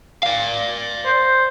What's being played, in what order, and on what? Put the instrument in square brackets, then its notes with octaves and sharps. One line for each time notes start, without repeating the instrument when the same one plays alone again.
[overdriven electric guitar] D5 F5
[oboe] C5